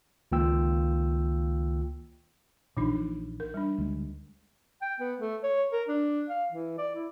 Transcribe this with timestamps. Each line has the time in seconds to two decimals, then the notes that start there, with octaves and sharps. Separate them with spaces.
0.32 C#2 D#3 A#3 F4 G5 E6
2.77 A#1 A#2 E3 D4 D#4
3.40 A#4
3.54 G3 D4
3.78 D2 G#3
4.82 G5
5.00 B3
5.20 A3
5.43 C#5
5.72 A#4
5.88 D4
6.29 F5
6.52 E3
6.78 D5
6.95 E4